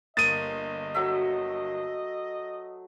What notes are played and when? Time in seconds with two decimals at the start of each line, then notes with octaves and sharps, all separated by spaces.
0.17 G1 A#3 D#5 D#6 A6 D#7
0.94 F#3 A3 E5